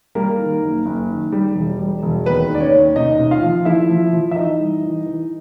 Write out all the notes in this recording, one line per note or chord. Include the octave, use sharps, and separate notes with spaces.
G3 A#3 A#4
D#3
F#1
F#1
D#3
G3
E1
G3
E1
D#2 B3 B4
D#3
D5
C#4 C#5
D#2
C3 D#4 D#5
C3
F4 F5
F3
F3 E4 E5
F3
F3
E5
E3 D#4 D#5
G3
E3
E3